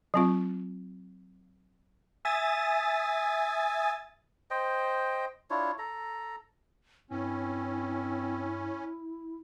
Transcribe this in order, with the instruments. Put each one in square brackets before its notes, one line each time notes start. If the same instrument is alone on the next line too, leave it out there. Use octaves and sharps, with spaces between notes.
[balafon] F#3 C4 F4
[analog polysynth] E5 G#5 D#6 A6
[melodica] C5 D#5 G5
D4 E4 F4 C#5
A4 A#5
[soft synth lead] G2 [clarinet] C4 [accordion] C#4 [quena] E4